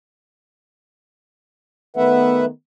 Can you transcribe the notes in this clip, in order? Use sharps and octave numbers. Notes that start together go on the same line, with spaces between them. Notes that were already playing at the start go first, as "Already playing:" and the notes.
D#3 A3 B3 B4 E5 F#5